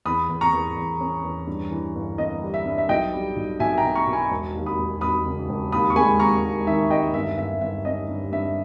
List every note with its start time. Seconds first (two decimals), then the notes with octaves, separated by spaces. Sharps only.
0.05 E2 B5 D#6
0.29 E2
0.41 A#5 C#6
0.53 E2
0.76 E2
1.00 C#4
1.24 E2
1.47 G2
1.71 E3
1.95 G1
2.18 G1 D#5
2.42 G3
2.54 E5
2.65 G2
2.78 E5
2.89 B1 D#5 G5
3.13 G3
3.36 B1
3.60 B1 E5 G#5
3.78 G5 A#5
3.84 B2
3.95 A#5 C#6
4.07 B2
4.13 G#5 B5
4.31 E1
4.54 D#2
4.66 B5 D#6
4.78 E1
5.01 E1 B5 D#6
5.25 C#3
5.49 E1
5.72 D#2 B5 D#6
5.90 C#6
5.96 G#3 G#5 B5
6.19 D#2 A#5 C#6
6.44 D#2
6.67 D#3 E5
6.90 D#2 D#5 G5
7.14 G1 E5
7.38 G1 E5
7.61 G1 E5
7.85 C#4 D#5
8.08 G2
8.32 G2 E5